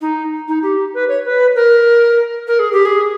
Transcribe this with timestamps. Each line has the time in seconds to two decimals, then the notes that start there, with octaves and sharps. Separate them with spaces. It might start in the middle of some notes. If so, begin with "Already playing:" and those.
0.01 D#4
0.48 D#4
0.63 G4
0.94 B4
1.08 C#5
1.25 B4
1.55 A#4
2.47 A#4
2.59 G#4
2.72 G4
2.85 G#4